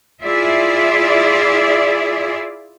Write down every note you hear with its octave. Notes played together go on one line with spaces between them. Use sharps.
E4 F4 G#4 D5 E5